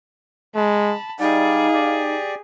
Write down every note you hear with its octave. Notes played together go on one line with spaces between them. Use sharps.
G#3 A5 B5
G3 D#4 G#4 D5 F5
G4 D5